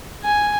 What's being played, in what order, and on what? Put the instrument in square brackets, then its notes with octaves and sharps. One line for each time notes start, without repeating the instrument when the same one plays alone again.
[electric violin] G#5